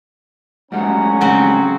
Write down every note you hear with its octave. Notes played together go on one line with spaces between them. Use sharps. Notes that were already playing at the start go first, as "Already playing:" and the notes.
G#2 F#3 G3 A3 C#4 F#5 A#5
C#3 C4 F#4